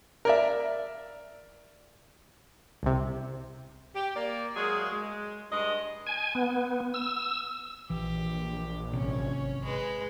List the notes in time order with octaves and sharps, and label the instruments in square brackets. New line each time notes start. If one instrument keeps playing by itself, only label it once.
[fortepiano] A#4 D5 E5
[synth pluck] C2 C3
[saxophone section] G4
A#3 D5
F#3 G#3 A#3 G#4
G#3
G2 G#3 D#5
[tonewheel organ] G#5
B3
E6
[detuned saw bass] A#1 [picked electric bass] E3 [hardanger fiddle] G4
[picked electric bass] G#1 C3 [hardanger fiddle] C#4
[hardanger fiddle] G#3 B4